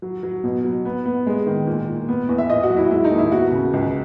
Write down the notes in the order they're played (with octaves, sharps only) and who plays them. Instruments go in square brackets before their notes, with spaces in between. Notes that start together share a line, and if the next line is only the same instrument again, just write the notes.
[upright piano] F#3
F#3
B2
F#3
B3
B3
G#3
D#3
A#2
A#2
B3
E2
E5
A#2 D#5
F#4
F#3
E4
G#3 E4
D#4
D#2
E4
B3 F#4
C#3
C#2